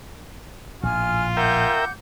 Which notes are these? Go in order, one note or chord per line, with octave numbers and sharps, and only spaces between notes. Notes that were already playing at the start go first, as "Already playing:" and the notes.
A#1 A2 F4 G#5 F6
A#4 E5 F#5 G5 D6 G6